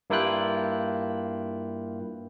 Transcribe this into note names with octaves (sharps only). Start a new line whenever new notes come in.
G2 A#3 E4 F4 G5 F#6